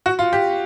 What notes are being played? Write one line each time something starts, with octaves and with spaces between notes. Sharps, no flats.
F#4
F4
G4